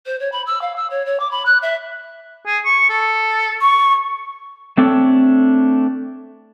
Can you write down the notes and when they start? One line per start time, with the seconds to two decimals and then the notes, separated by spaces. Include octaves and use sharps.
0.06 C5
0.19 C#5
0.32 B5
0.46 E6
0.61 F5
0.76 E6
0.90 C#5
1.05 C#5
1.19 D6
1.31 B5
1.45 F#6
1.62 E5
2.47 G#4
2.65 C#6
2.89 A4
3.61 C#6
4.77 A3 C4 D4 A4 C#5